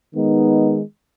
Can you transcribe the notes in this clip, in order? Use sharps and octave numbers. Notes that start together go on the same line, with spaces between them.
D#3 G#3 B3 D#4